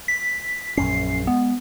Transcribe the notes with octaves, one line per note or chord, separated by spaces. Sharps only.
B6
A#1 F#2 C#4 C7
G#3 B3